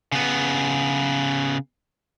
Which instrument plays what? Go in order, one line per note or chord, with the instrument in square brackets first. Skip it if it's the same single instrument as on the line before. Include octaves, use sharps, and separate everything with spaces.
[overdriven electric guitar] C#3 B3